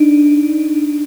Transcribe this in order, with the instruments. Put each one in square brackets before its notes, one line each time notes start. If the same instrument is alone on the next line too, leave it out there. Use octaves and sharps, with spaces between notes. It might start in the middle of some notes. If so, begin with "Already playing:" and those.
Already playing: [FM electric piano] D4 D#4